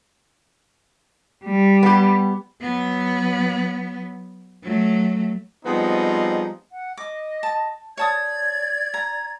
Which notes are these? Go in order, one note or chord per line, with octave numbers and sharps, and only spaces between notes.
G3
B3 G4
F#3 B3
F#3 A3
F3 G3 G#3 B3 C4 D#4
F#5
D#5 D6
A5
C#5 D5 A5 D#6 G#6
A#5